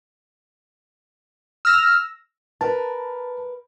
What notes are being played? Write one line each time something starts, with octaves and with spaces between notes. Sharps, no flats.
E6 F6 A#6
A#4 B4 A5